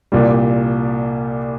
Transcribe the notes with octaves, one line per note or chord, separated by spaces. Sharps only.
C2 A#2 G3